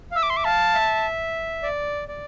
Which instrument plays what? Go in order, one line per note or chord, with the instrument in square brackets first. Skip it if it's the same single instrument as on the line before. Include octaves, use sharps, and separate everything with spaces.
[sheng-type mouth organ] F5
[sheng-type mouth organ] E5 [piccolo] E6
[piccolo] D6
C6
D6
[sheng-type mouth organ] F5 [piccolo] A5
[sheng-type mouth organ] E5
D5
D5